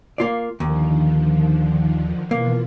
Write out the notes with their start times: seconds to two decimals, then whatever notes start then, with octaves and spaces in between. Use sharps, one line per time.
0.18 A#3 F4 D5
0.60 D#2 D3 D#3 F3
2.31 B2 E3 A#3 F4